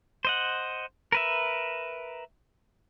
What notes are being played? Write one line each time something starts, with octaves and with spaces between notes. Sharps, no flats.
C5 D#5 F#5
A#4 B4 E5